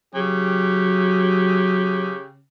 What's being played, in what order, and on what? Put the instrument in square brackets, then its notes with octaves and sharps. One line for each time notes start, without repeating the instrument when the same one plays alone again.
[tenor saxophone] C#3 [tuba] F#3 [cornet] G4